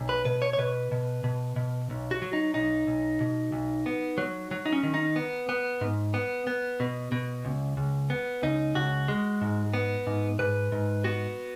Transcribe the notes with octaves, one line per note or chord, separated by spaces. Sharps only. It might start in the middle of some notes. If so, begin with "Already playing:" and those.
Already playing: B1
B4
B2 B4
C#5
C#5
B2 B4
B2
B2
B2
B1
F#4
F#3
D#4
B1 D#4
B1
B2
B1
B3
F#3
F#3
D#4
C#4
D#3
D#4
B3
B3
G#2
B3
B3
B2
B2
C#2
C#2
B3
C#2 D#4
C#2 F#4
G#3
G#2
B3
G#2
G#2 B4
G#2
B3 F#4